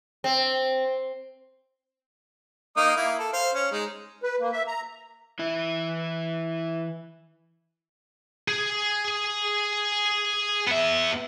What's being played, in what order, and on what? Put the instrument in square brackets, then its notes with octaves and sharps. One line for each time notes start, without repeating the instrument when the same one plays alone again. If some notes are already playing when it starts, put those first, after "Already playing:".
[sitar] C4
[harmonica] A#3 D#4 D#6
A#3 E4
A4
C5 F5
C#4
G#3 D#4
[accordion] B4
A#3
E5
A#5
[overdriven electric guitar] E3 E4
[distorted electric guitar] G#4
B3 E5